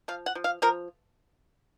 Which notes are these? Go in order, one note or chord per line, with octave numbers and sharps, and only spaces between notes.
F3 F5
F#5
F3
F5
F3 A#4